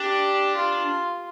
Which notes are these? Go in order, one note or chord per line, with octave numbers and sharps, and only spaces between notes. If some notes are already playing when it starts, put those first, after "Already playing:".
Already playing: D4 G4
F4